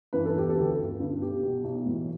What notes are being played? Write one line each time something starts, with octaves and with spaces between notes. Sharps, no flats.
G2 E3 B4
A4
E1 G4
A4
D2 D3
G1
G2 D3
B1 G4
B2
B1
A2 E3